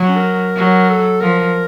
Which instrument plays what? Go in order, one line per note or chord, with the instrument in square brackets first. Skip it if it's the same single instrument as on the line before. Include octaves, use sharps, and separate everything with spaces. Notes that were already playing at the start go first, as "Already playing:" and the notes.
Already playing: [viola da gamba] F#3
[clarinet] C#4
A#4
[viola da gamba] F#3
[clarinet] A4
[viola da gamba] F3 [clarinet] A#4